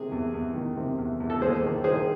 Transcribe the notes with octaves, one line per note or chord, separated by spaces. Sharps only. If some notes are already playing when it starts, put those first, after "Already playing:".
Already playing: C3 D#3 G#4
E2
E2
D#3
C3
E2
E2
A4
D#2 G#4 C5
D#3
D#3 G#4 C5